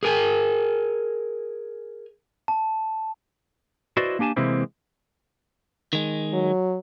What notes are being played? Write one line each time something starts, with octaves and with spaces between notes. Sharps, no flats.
G#4 A#4 G#5
A5
E4 F#4 B4 C5 D5 D#5
A#3 D4 G4 G#5 A5
C3 E3 G#3 A#3 C4 E4
D#3 G#3
F#3